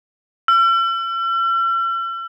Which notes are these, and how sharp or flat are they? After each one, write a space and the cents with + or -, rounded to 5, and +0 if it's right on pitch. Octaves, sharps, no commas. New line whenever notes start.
E6 +45